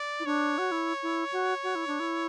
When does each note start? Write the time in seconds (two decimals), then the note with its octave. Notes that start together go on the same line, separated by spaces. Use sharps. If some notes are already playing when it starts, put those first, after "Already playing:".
Already playing: D5
0.20 E4
0.25 D4 C#5
0.58 F#4
0.72 E4
1.03 E4
1.33 F#4
1.64 F#4
1.75 E4
1.87 D4
2.00 E4